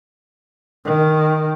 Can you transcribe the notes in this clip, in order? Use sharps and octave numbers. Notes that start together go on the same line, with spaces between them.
D#3